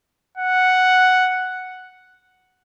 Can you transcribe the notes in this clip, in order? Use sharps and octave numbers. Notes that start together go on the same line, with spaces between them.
F#5